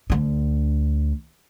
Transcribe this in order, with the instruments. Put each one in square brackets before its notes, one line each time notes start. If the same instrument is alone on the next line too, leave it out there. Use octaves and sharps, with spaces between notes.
[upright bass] D2 D3